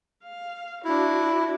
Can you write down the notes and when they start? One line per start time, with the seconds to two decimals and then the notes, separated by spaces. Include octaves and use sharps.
0.23 F5
0.85 D4 E4 F#4